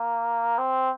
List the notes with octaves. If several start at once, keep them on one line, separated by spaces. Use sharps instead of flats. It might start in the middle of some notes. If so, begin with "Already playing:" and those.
Already playing: A#3
C4